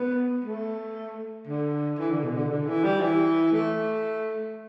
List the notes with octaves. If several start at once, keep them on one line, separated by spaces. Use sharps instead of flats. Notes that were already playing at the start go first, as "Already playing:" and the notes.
Already playing: B3
A3
D3
E3
D3
B2
D3
D3
E3
G3
E3
A3